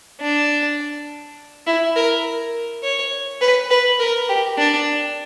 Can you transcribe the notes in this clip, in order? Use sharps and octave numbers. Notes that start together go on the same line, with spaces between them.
D4
E4
A#4
C#5
B4
B4
A#4
G4
D4